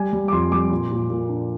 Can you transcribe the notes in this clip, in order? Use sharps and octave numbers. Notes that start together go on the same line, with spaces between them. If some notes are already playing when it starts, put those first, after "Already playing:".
Already playing: G3 G#5
G3
D6
F2 C6
G3 D6
A#2
A#2
A#2
D4